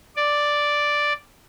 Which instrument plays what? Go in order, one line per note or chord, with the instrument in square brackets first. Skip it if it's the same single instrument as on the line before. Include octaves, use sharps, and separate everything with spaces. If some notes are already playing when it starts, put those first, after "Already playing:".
[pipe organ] D5